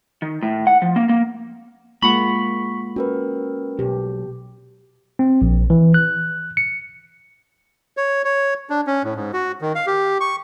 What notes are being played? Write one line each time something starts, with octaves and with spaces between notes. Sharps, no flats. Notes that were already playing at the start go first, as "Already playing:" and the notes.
D#3
A2
F#5
F3
A#3
A#3
G#3 A#3 F4 F#5 B5 C#6 B6
C#4 F#4 A#4 B4
B1 G4
C4
A#1
E3
F#6
C#7
C#5
C#5
D4
C#4
A2
G#2
F#4
D#3
F5
G4
C#6